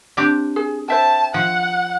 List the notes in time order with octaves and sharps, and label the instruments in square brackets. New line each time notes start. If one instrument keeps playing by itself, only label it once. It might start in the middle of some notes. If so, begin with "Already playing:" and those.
[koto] C4 D4 G4
[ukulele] G#4
[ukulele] C5 E5 G5 [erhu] A5
[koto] F3 [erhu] F#5